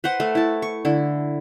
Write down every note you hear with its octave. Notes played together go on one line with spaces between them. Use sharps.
B4 C5 F#5
A3
E4 A5
C#6
D3 E4